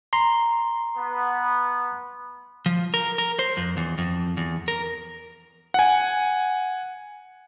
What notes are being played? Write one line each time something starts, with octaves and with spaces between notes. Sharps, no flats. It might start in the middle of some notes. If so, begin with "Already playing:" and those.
A#5 C6
B3
F3
A#4
A#4
C5
F2
E2
F2
E2
A#4
F#5 G#5